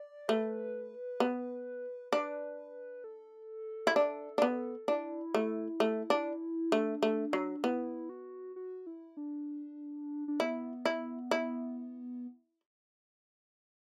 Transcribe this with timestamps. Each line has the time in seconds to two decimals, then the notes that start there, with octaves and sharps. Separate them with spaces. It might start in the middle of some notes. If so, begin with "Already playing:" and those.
Already playing: D5
0.28 A3 B4
1.20 B3
2.12 D4 B4
3.04 A4
3.87 E4
3.96 D4
4.38 D4
4.42 B3
4.88 D4 E4
5.34 A3
5.80 A3
6.10 D4
6.72 A3 D4
7.02 A3
7.33 F#3
7.64 B3 E4
8.09 F#4
8.56 F#4
8.87 E4
9.17 D4
10.28 D4
10.40 B3 E4
10.85 E4
11.31 E4